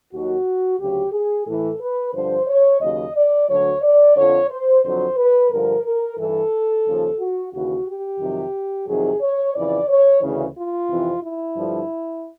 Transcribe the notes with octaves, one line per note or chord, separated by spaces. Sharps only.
D#2 D#3 F#3 F#4
D2 C#3 F#3 G4
G#4
A2 E3 A4
B4
G2 D3 F3 C5
C#5
D#2 C#3 F#3 D#5
D5
D2 D3 F#3 C#5
D5
F2 D3 F3 C#5
C5
F2 D3 F#3 C5
B4
G2 D3 F3 A#4
A#4
G2 E3 A4
D#2 C#3 F3
F#4
D#2 C#3 E3 F#4
G4
F2 C3 D#3 F#3
F2 C3 D#3 F#3 G#4
C#5
F2 C#3 E3 D5
C#5
D2 C#3 E3
F4
F2 C3 E3
E4
G2 D3 F3